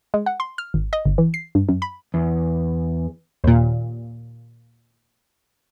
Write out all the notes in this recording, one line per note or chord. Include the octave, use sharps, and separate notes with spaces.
G#3
F#5
C6
F6
G#1
D#5
G1
E3
C7
G2
F#2
B5
E2
D#2 A#2